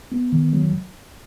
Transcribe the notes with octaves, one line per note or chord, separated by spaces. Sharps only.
B3
D#3
F#3